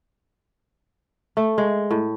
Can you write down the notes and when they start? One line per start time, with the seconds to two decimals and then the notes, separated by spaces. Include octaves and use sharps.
1.37 A3
1.58 G#3
1.91 A2